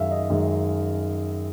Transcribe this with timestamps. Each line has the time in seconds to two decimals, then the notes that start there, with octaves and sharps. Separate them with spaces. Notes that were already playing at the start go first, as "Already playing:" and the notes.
Already playing: F#2 D#3 G#3 E5 F5
0.11 D#5
0.30 F#2 D#3 G#3